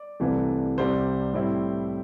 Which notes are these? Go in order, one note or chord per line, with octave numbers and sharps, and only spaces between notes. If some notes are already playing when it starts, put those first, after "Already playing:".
Already playing: D5
C2 C3 E3 A3
C2 C3 G3 C5
A2 G3 C4 E4